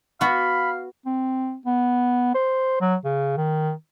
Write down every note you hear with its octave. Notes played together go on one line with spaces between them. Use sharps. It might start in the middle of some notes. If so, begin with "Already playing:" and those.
B3 F#4 F5 B5
C4
B3
C5
F#3
C#3
D#3